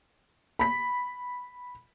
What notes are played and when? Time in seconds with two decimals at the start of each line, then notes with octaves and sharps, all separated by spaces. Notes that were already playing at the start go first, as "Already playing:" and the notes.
0.59 B5 B6